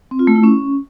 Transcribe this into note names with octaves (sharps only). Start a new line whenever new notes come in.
C4
F4
A3
E4
C#4